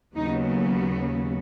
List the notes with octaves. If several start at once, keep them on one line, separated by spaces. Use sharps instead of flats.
D#2 C#3 F#3 B3 D#4